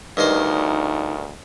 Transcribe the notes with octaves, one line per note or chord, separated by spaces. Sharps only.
D2 G2 D#3 D#4 C5